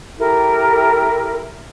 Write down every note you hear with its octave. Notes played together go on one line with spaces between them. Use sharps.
E4 G4 A4 A#4